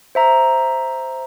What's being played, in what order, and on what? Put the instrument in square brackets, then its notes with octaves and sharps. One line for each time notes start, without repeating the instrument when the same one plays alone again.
[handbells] C5 E5 A#5